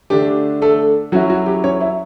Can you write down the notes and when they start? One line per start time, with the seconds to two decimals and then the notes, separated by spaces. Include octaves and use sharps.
0.10 D3 A3 D4 G4
0.62 A3 A4
1.12 F#3 C#4 E4 F#4
1.30 F#4
1.46 G4
1.64 C#4 C#5
1.80 E4 E5